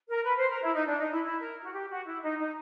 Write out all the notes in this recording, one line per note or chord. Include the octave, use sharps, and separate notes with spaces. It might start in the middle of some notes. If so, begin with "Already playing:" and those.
A#4
B4
C5
A#4
E4
D#4
D4
D#4
E4
E4
A#4
F#4
G4
F#4
E4
D#4
D#4